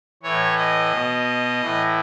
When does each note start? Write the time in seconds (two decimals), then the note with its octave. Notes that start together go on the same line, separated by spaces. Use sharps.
0.23 A2 E3 C#5
0.57 D#5
0.92 B2
1.61 A2 E3